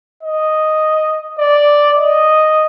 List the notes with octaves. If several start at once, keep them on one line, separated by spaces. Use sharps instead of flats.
D#5
D5
D#5